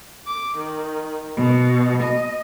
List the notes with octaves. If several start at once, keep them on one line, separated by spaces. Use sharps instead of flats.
D6
D#3
B2
D#5